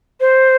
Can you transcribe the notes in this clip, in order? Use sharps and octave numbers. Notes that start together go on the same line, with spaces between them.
C5